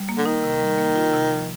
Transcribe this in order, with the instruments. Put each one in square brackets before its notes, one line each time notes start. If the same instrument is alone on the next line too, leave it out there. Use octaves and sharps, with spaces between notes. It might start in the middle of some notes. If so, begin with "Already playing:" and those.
Already playing: [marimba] G3
A#3
[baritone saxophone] D3
[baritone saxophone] D#3 [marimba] D#4
[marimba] C3
G3
A#3
F4
C3
F3